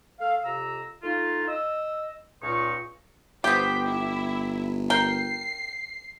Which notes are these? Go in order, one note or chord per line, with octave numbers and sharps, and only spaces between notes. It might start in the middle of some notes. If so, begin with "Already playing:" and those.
A3 A4 F5
F2 C3 A#5 E6
A3 D#4 F4
D#5 E6
C#2 A#2 D#4 C#6
G1 B3 G4 C5 G5 B6
E4 E5
A#4 G5 C7